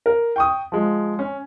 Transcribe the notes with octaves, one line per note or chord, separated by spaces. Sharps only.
A#4
G5 C#6 D#6
F3 G#3
C#4